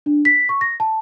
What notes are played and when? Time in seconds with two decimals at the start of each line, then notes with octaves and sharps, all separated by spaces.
0.06 D4
0.25 B6
0.49 C#6
0.61 A#6
0.80 A5